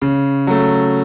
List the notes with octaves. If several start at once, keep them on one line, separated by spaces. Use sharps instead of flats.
C#3
F#3 A3